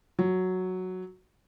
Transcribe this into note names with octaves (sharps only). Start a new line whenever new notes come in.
F#3